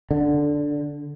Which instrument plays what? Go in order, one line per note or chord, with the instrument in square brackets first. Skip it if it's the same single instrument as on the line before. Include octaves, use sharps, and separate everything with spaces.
[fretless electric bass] D3